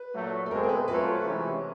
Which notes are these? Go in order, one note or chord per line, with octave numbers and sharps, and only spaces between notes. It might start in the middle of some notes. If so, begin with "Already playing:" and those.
Already playing: B4
A#2 F#3 A3
A4
B2 G#3 C4 A#4
A#4
B4
F#3 A3 C4 F4 B4
C3 E3 G#3 C#4